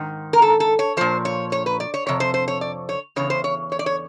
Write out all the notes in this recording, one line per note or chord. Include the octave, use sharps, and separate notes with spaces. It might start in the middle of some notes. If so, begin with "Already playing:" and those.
Already playing: G#2 D#3
A#4
A4
A4
C#5
A#2 F3 C5
C#5
C#5
B4
D5
C#5
F2 C3 C#5
C5
C5
C#5
D5
C#5
E2 C#3 C#5
C5
C#5
C#5
D5
C#5